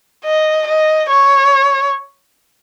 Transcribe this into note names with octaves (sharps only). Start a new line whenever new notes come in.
D#5
D#5
C#5